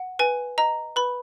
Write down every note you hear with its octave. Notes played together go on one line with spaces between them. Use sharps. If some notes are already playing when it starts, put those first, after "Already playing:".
Already playing: F#5
B4 G#5
D#5 A#5
B4 B5